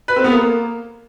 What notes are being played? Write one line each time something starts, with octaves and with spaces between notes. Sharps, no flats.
B4
C4
B3
A#3